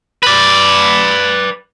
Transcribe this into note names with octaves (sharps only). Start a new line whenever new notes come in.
B4 D5